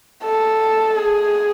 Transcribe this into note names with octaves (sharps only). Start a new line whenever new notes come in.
A4
G#4